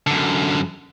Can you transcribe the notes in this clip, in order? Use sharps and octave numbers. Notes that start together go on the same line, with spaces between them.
F#2 D3